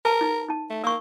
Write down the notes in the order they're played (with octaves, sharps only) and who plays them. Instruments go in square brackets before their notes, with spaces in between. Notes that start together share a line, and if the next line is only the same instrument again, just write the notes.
[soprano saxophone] A#4 [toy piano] B4 A5
[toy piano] D#4
D#4 A5
[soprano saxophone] A3
[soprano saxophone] A#3 [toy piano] A#4 C#6